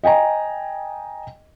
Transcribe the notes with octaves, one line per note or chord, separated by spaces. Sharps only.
D#5 G5 G#5 A#5